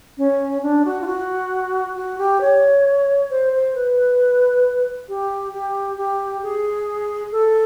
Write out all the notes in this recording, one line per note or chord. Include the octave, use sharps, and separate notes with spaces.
C#4
D4
F#4
F4
F#4
F#4
G4
C#5
C5
C5
B4
G4
G4
G4
G#4
A4